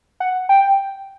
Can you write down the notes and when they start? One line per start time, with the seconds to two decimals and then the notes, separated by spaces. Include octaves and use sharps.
0.20 F#5
0.49 G5